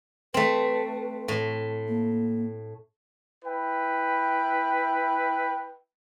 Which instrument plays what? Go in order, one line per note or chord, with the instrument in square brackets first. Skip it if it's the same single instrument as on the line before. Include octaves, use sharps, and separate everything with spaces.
[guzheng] A3 C4 [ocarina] B4
[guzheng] A2
[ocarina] A#3
[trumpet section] E4 B4 G5